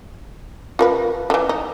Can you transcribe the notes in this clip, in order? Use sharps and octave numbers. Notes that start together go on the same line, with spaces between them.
F4 A#4 B4
D3 E3
D#4